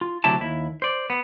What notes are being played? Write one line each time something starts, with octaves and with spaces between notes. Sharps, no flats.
F4
D2 C3 F#3 E4 G4 A5
D#2 E4
C5 D5
B3